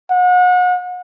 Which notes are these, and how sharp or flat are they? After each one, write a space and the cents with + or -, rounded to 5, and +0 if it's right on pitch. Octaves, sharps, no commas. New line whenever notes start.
F#5 -35